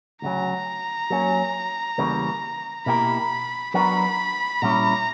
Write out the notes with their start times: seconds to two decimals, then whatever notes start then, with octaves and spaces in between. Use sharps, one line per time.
0.22 D2 C#3 F#3 A#5
1.10 F#3 A#3 C#4
1.98 E2 C#3 E3 G3 A#3
2.86 B2 A#3 E4 G4 A#4 B5
3.74 F#3 B3 D4 A#4 B5
4.62 A#2 G3 C#4 E4 A#5